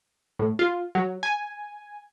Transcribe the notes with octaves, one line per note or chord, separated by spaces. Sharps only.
A2
F4
F#3
G#5